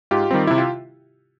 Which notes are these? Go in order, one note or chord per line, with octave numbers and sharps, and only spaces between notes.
G#2 F4 G4
D#3 G3 C4
C3 E4
F4